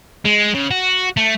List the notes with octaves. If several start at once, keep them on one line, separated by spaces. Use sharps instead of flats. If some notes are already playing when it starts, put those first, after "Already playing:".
G#3
C#3
F#4
A3